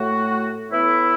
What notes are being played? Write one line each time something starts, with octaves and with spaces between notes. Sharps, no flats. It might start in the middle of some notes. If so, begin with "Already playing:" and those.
Already playing: A2 A3 F#4
A2 E3 B3 E4